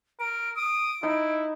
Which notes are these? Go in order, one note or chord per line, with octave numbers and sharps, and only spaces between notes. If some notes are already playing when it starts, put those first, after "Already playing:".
A#4 D7
D#6 D7
D#4 E4